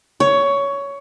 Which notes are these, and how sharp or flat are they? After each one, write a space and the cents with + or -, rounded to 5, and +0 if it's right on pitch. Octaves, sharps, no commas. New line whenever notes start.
C#5 +15